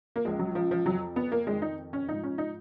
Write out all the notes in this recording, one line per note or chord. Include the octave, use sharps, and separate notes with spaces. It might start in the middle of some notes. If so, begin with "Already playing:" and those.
A#3
C#2 C#3 F3 G#3
F#3
F3
F3
F2 F3 F#3
B3
A#3
F2 D#3 G#3
D#4
C#4
G#2 F3 D#4
C#4
D#4